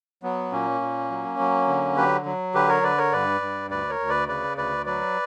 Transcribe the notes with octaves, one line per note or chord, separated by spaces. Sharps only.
F#3 B3
A#2 A#3 C#4
A#2
F#3
F#3
D3
F#3 G4 B4
F#3
D3 G4 B4
A#4 C#5
D3 B4 D5
A#4 C#5
G2 B4 D5
G2
D2 B4 D5
A#4 C#5
D2
B4 D5
C#3 B4 D5
D2 B4 D5
F#3 B4 D5